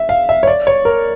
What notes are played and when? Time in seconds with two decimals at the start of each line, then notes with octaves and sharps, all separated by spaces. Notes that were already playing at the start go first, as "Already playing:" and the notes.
Already playing: E5
0.09 F5
0.29 E5
0.43 C#5
0.47 D5
0.67 C#5
0.85 A#4